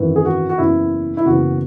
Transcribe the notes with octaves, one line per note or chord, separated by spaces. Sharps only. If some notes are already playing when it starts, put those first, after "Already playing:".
Already playing: G#1 F#2 E3
G#4
F#4
F#4
F#1 E2 C#3 E4
E4
F#1 E2 C#3 F#4